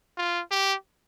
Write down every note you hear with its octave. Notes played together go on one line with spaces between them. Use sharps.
F4
G4